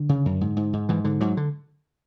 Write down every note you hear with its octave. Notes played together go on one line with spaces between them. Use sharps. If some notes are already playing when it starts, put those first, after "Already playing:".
Already playing: D3
C#3
F#2
G#2
G#2
G#2
G#2 E3
G#2 D3
G#2 F#3
D3